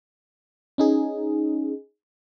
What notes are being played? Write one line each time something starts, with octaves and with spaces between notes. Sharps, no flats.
C#4 D#4 G#4